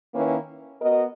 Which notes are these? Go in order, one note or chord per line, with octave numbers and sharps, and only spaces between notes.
D#3 A#3 C#4 E4 B4
B3 F#4 A#4 D#5